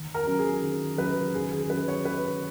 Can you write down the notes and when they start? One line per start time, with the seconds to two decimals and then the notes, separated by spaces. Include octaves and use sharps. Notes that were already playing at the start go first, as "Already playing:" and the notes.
Already playing: D#3
0.14 A#4
0.27 F#3 C#4 F#4
0.39 G#4
0.62 D#3
0.98 F#3 C#4 F#4 B4
1.34 D#3 G#4
1.51 G#4
1.70 F#3 C#4 F#4 B4
1.88 C#5
2.05 D#3 B4